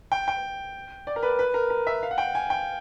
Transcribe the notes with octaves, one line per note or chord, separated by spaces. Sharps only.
G5
G5
D5
A#4
B4
B4
A#4
A#4
E5
F5
F#5
G5
G#5
G5